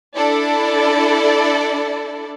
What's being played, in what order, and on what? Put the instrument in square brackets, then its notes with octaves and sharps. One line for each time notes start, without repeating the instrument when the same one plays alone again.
[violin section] D4 E4 A4 D5